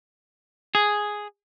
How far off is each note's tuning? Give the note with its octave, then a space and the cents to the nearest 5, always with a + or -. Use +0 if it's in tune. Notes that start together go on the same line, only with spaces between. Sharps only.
G#4 +0